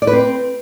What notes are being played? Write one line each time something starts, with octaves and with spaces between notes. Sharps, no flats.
D5
B4
C4